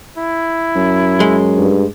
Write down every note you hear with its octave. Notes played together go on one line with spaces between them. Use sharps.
E4
F#2
G#3
G2